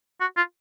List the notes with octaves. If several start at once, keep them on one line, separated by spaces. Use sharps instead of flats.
F#4
F4